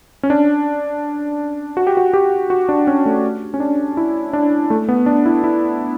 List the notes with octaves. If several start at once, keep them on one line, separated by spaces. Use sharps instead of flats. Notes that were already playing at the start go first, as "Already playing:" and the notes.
C#4
D4
F#4
G4
F#4
G4
F#4
D4
C#4
A3
C#4
D4
E4
D4
A3
B3
D4
E4
E4